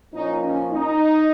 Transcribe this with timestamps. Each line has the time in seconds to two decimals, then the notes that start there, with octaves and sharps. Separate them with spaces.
0.12 A#2 F3 A#3 C#4 D#4
0.43 C#4
0.72 D#4